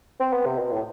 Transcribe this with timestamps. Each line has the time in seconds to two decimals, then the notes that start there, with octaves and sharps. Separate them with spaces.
0.20 C4
0.33 B3
0.46 C3
0.59 B2
0.72 A2